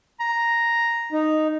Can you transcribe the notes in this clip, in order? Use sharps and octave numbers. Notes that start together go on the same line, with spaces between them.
A#5
D#4